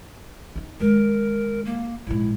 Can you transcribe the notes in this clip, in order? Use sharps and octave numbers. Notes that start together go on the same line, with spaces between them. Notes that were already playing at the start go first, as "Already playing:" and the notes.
C4 D#4
D#3 G#3 A#4
A#3
A#1 G#2 E4